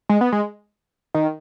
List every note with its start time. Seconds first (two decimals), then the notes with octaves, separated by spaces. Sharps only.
0.09 G#3
0.21 B3
0.32 G#3
1.15 D#3